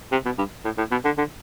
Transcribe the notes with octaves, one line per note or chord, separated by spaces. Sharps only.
C3
B2
G2
A2
A2
B2
D3
D3